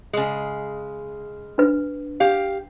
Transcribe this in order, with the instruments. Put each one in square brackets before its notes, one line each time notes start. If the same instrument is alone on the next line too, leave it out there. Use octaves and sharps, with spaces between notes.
[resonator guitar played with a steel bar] C#3 G#3
[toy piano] D4 B4
[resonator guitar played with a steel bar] G4 F5